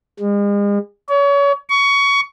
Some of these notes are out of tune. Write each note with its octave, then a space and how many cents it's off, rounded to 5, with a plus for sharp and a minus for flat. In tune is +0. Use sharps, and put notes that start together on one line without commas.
G#3 -40
C#5 +30
C#6 +20